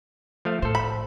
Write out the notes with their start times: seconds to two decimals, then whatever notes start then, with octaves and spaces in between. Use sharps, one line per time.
0.45 F3 A3 F5
0.62 A2 A4 C5
0.75 B5